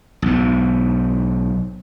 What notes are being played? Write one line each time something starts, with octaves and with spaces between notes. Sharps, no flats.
B1 G#2